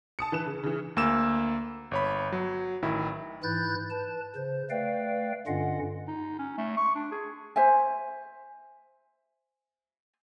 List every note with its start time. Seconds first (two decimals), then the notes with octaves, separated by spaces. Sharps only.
0.19 A5 D#6 C#7
0.32 E3 B4 E7
0.46 C#3
0.63 C#3 E3
0.96 D2 A#3 E6 E7
1.91 G1 C#5 B5
2.32 F#3
2.82 A1 D#3 E4
3.43 G#2 E3 E4 F#6 G6 A6
3.90 B4 A5
4.35 C#3 C5
4.70 A3 B4 D5 F5 G5
5.47 G2 D3 C#4 F4 D#5 F#5
6.08 D#4
6.39 C#4
6.58 A3
6.77 C#6
6.95 D4
7.12 G#4
7.56 C5 E5 G#5